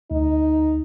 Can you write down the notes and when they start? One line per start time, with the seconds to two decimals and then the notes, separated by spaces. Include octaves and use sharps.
0.11 D2 D#4